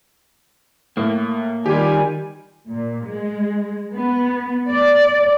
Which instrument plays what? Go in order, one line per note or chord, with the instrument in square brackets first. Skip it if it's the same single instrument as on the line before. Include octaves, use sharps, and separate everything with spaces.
[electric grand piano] A2 [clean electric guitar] A#3
[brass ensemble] D#3 G#5 [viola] G3 [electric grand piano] F4 G4
[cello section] A#2
G#3
B3
D5